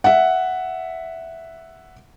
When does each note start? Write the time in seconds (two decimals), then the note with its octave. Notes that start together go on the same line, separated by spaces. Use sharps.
0.04 E5 F#5